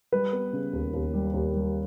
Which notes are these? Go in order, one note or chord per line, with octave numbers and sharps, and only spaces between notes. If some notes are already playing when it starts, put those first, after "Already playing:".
G3 B4
B3
C#3
D#2
D#2
G3
D#2
G3